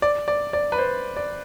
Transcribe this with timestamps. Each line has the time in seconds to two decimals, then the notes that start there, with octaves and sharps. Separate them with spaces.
0.02 D5
0.28 D5
0.53 D5
0.72 B4
0.78 C5
1.16 D5